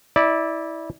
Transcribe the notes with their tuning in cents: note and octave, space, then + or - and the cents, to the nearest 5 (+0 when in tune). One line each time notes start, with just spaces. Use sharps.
E4 -20 D5 +0